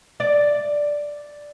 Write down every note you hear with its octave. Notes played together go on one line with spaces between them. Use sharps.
D5